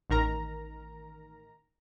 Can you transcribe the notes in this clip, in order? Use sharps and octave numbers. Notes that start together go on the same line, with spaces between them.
A1 D#3 A#4 A#5